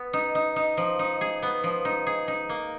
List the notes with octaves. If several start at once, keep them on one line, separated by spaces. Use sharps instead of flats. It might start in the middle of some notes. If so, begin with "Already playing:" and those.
Already playing: B3
D#4
D#4
D#4
F3
D#4
G#4
B3
F3
D#4
G#4
D#4
A#3